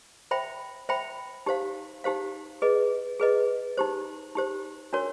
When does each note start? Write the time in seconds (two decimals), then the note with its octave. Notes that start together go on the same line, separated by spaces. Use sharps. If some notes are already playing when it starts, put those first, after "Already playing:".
0.31 C5 E5 G5 B5
0.89 C5 E5 G5 B5
1.46 D#4 G4 C5 F5
2.04 D#4 G4 C5 F5
2.62 G#4 B4 D#5
3.20 G#4 B4 D#5
3.77 D#4 G4 C5
4.35 D#4 G4 C5
4.93 D4 F#4 A#4 C#5